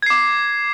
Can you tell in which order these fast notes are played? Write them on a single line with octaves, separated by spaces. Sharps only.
G#6 C7 D6